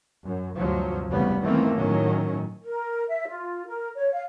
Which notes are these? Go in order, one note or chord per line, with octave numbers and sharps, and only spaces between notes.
F#2
D2 G2 C3 F3 F#3
F1 E2 C#3 G3 B3
E2 D#3 E3 A3 A#3 C4
A2 D#3 F#3 C#4
A#4
E5
F4
A#4
C#5
F5